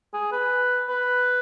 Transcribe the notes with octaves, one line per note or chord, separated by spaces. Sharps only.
G#4
B4
B4